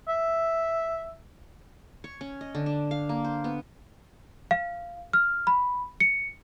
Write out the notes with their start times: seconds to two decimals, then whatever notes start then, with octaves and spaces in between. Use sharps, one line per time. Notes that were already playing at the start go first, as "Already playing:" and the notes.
0.08 E5
2.04 C#5
2.21 C#4
2.41 D#5
2.55 D3
2.66 D4
2.91 F5
3.09 A#3
3.24 C5
3.44 B3
4.51 F5
5.13 F6
5.47 B5
6.00 C#7